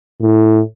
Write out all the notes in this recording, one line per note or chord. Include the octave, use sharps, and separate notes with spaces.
A2